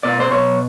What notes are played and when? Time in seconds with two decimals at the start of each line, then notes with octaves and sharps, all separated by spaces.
0.03 B2 D5
0.20 C5
0.31 B2 C#5